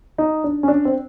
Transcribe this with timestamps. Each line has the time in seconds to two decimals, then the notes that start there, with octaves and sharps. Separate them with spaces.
0.18 D#4
0.44 D4
0.63 C#4
0.68 D4
0.85 C4